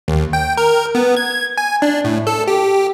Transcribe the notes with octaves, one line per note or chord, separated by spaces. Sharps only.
D#2
G5
A#4
B3
G#6
G#5
D4
A2
A4
G4